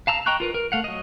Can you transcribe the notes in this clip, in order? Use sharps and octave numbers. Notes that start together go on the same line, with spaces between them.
F5 A5 A#5 E6
D#5 G5 A#5 C#6 F#6
F4 A#4 B4
A#4
A3 F5 F#5
F#3 D#5